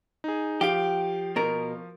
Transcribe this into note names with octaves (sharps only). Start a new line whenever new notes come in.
D#4 G#4
F3 G4 F5 D7
B2 A#4